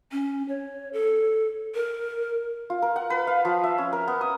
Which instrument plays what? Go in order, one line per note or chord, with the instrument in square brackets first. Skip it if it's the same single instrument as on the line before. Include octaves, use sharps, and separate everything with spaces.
[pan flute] C#4
C#5
A4
A#4
[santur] F4
A#4
F#5
B4
F5
F3
E5
C#4
A#4
B3
D#6